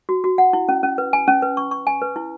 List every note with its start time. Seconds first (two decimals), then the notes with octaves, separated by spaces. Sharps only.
0.09 F#4
0.24 F#4
0.38 F#5
0.53 E4
0.69 C#4
0.83 C#4
0.98 B4
1.13 G#5
1.28 C#4
1.42 B4
1.57 C#6
1.71 C#6
1.87 G#5
2.02 B4
2.16 E4